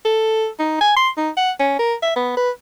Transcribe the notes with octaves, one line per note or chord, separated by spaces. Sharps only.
A4
D#4
G#5
C6
D#4
F#5
C#4
A#4
E5
B3
B4